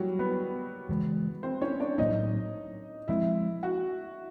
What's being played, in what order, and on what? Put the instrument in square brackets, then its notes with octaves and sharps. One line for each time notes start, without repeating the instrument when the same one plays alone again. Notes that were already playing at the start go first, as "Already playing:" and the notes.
Already playing: [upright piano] F#3 G3 F#4 G4
B3 B4
[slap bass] C#3 E3 G#3
[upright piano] C4 C5
C#4 C#5
D4 D5
[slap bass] A2 F#3 A#3 C#4 [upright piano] D#4 D#5
[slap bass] F3 G#3 C4 [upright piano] E4 E5
[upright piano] F#4 F#5